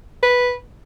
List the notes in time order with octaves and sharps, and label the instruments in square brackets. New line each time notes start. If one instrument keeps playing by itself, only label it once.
[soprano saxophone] B4